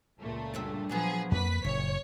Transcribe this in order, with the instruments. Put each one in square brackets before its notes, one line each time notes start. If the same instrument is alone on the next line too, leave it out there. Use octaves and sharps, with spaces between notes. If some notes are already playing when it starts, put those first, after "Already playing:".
[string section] C#2 A#2 A3
[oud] D2 G2 E5
[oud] A#2 F#3 B3 [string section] F3 G#4
[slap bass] F2 A3 A#3 [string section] B4 B6
[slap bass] F#1 [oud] A#2 [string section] C#5